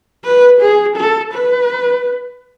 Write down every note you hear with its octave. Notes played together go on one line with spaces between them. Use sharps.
B4
G#4
A4
B4